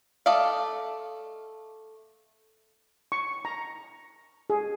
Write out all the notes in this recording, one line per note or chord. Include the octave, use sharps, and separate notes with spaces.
A3 D5 D#5 F5
C#6
A#5
G#4